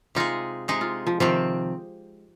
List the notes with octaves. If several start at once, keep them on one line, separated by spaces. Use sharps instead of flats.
C3 G#3 D#4 F4 G#4
C3 G#3 D#4 G#4
F4
F3
C3 D#3 F3 C4